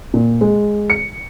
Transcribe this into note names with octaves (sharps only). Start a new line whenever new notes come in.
A#2
G#3
C#7